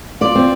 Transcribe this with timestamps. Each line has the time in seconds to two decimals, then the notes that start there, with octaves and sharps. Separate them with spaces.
0.21 F4 D5
0.36 C4